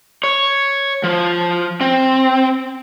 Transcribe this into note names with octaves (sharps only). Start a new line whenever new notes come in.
C#5
F3
C4